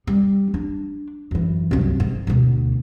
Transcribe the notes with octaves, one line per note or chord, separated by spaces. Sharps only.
G3
D4
F#2 E3
C2 F#2
G#2
D2 B2